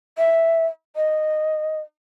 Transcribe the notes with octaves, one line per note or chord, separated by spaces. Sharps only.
E5
D#5